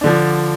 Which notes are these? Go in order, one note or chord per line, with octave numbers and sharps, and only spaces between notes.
D3 F3 D4